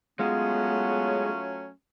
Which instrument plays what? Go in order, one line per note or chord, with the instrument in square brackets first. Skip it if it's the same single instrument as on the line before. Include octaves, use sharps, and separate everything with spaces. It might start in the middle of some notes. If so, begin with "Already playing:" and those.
[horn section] F#3 A3 C#4 [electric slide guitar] G#3 [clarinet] B3 [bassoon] F4